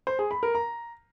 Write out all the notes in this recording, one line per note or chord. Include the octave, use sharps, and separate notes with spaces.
C5
G#4
B5
A#4
A#5